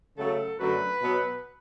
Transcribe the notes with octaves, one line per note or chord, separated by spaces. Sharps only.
C#3 F#3 A3 A4
F#2 D3 F#3 A3 B4
B2 F#3 B3